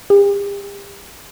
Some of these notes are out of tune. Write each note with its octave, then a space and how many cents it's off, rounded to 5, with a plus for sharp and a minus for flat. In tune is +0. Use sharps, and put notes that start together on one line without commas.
G4 +40